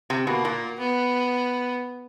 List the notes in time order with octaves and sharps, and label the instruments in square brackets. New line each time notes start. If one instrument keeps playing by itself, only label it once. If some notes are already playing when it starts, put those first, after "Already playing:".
[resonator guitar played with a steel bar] C3
[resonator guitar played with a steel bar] B2 [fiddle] A#3
[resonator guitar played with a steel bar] A#2
[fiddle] B3